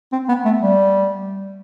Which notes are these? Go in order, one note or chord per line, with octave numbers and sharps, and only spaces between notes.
C4
B3
A3
G3